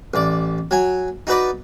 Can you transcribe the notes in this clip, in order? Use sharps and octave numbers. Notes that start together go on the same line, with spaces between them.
A1 D5
F#3 G#5
D#4 F#4 B4 D5